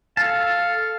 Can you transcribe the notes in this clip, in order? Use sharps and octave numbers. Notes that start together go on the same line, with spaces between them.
A4 F5 A5